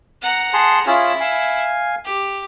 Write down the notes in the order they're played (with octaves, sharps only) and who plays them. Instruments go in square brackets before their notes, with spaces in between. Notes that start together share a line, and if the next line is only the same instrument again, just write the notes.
[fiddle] F#5 A#5
[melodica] G#4 A5 C6
[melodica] C#4 F4 G#4 [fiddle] E4
[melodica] F5 G#5
[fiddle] G4